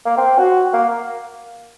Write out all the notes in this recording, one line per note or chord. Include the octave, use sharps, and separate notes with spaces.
A#3
C4
F#4
A#3